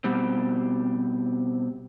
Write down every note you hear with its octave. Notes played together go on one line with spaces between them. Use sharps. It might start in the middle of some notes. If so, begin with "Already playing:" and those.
B2 G3 C4